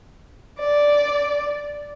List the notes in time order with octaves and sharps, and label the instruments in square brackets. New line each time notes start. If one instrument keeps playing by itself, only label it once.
[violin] D5